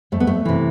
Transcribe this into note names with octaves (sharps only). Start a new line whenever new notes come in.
F2 A3
B3
A3
C3 E3